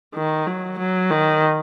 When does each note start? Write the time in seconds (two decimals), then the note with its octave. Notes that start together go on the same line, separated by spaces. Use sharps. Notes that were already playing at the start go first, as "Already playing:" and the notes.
0.15 D#3
0.46 F#3
0.79 F#3
1.11 D#3